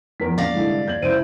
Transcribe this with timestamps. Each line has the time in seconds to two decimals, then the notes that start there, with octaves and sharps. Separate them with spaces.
0.20 E2 F3 A#4 B6
0.38 A#3 C#4 D5 F5 A#6
0.54 C2 G#2 D3 E4 A4
0.87 D#2 G6 G#6 F#7
1.02 C#2 E4 C5 D7 D#7